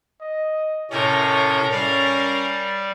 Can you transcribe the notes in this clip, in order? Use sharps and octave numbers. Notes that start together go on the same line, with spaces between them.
D#5
A2 C3 C#4 A4 A#4 C#5
G3 C#4 A#4 D5 F5